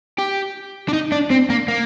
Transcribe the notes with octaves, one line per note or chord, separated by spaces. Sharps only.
G4
D4
D#4
D4
C4
A#3
A#3